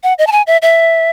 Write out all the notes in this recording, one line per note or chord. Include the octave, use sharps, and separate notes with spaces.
F#5
D#5
A5
G#5
E5
E5